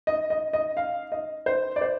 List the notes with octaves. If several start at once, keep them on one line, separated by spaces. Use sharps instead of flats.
D#5
D#5
D#5
F5
D#5
C5
D5
C5